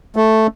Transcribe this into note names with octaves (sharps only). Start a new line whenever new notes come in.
A3